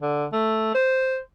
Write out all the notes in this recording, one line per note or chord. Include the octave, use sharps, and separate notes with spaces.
D3
A3
C5